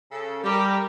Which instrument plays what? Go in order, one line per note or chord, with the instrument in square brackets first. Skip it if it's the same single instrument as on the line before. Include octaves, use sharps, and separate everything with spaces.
[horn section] C#3 A4
[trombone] G3 [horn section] G4 [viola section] A#4 A#5